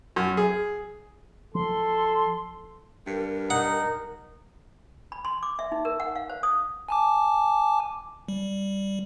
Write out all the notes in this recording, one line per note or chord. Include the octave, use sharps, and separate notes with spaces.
F#2
G#4
F3 A4 C6
G2 A#4
D#4 F#5
B5
C6
D6
E5
D#4
A#4
F#5
F5
C5
D#6
G#5 A5 D6
G3